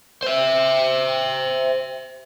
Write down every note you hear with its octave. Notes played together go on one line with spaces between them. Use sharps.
C5 E5